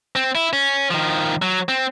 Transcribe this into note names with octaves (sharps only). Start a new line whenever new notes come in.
C4
E4
C#4
D#3 F3
F#3
C4